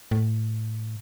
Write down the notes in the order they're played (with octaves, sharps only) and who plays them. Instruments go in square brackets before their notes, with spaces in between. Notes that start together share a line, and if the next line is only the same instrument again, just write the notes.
[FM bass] A2